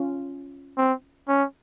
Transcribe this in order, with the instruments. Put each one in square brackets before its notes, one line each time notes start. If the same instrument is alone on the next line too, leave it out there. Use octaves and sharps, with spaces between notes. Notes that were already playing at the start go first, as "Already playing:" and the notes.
Already playing: [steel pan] C#4 F4
[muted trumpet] C4
C#4